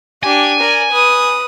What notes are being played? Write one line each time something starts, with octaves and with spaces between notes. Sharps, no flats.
D4 G4 G#5
A#4 D5
B4 D#6